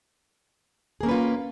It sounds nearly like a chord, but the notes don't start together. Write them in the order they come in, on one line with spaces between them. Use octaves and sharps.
G#4 A#3 C#4 B4 F4